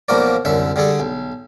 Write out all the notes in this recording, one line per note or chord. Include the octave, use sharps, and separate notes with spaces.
B1 F3 A#3 F#4 A#4 D5
C2 F#2 D3 E5
D3 G3 G#4 A4
B1